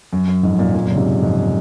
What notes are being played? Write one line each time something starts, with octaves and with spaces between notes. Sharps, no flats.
F#2
F#2
F2 G#2
F#2 A#2
F#2 A#2
F#2 A#2
C#3
G#2 C3
F2 G#2